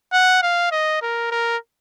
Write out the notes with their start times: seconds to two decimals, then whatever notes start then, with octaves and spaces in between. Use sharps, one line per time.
0.13 F#5
0.42 F5
0.72 D#5
1.02 A#4
1.31 A#4